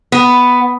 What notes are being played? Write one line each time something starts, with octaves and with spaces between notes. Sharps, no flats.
B3